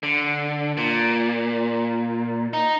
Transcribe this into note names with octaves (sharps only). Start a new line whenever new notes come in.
D3
A#2
D#4